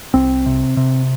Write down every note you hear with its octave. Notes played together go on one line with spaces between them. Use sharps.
C2 C4
C3
C3